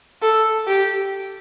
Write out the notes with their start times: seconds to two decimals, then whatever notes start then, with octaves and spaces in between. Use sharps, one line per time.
0.22 A4
0.67 G4